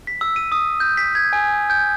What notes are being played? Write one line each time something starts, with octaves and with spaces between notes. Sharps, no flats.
B6
E6
D#7
D#6
G6
B6
G#6
G#5
G6